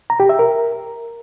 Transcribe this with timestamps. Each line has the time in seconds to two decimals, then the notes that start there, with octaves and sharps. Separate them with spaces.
0.10 A#5
0.20 G4
0.29 E5
0.39 A#4